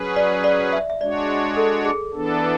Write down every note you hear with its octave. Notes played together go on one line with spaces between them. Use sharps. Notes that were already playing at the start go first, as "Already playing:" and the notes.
Already playing: F#3 C#4 G#4 B4
D5
D5
E5
E5
G#3 D4 F#4 C#5 D5
A4
G#4
E3 B3 D4 A4